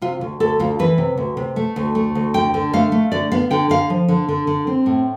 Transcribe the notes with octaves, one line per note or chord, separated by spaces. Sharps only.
C3 F4
D2
D2 A4
D2 F4
E3 B4
C3
D2
C3
A3
D2
A3
D2
D3 G5
D3
A3 F5
A3
D3 D5
B3 F5
D3 G5
D3 F5
F3
D3
D3
D3
C4
A2